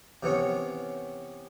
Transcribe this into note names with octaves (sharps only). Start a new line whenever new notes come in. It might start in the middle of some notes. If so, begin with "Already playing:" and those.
C3 E3 B3 C#4